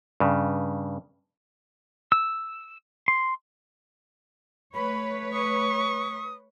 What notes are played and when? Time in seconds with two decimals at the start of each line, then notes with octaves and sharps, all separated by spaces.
0.20 G2 C#3
2.12 E6
3.08 C6
4.74 A3 B4 C#5 B5
5.33 C#6 D#6